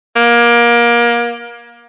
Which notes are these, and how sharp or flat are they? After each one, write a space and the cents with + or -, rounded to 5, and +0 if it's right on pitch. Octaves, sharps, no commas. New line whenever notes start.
A#3 +25